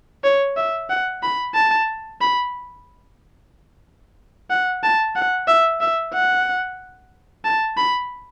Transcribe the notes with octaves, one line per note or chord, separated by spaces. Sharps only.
C#5
E5
F#5
B5
A5
B5
F#5
A5
F#5
E5
E5
F#5
A5
B5